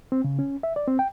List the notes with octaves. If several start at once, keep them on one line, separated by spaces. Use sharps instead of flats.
C4
C#3
C#4
E5
D5
C4
G5